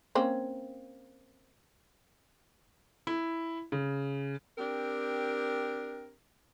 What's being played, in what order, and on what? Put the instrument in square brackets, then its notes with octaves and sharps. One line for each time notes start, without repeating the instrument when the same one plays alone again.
[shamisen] A#3 C4 C#4
[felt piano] E4
C#3
[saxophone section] C4 D4 G4 A#4